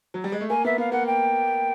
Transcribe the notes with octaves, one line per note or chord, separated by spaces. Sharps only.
F#3
G3
G#3
A3
A#3 G#5
B3 E5
B3 F5
A#3 F#5
G5